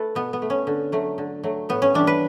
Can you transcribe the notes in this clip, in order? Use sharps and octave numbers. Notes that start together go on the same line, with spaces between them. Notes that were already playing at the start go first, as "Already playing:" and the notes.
Already playing: A3 A4 B4
B2 B3
B3
A3
C#4
D3
F#3 A3
D3
F#3 A3
A2 B3
C#4
E3 G3 D4
B4